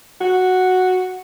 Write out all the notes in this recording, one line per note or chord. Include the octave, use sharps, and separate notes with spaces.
F#4